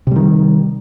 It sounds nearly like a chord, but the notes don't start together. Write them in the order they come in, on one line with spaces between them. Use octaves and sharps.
C3 G3 D#3